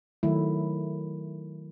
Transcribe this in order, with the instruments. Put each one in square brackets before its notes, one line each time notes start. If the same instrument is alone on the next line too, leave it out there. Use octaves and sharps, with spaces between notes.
[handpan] D#3 F#3 A3 E4